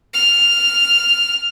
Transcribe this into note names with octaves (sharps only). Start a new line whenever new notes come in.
F6